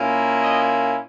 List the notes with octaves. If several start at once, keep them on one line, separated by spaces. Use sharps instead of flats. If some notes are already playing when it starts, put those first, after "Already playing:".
Already playing: A#2 A#3 C#4 E4
D#5